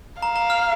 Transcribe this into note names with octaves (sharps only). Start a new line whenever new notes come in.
F5 A#5
A#5
F6